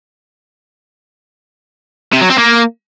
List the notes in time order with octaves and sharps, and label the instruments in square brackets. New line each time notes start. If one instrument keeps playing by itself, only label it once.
[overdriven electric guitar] C3
F#3
C4
A#3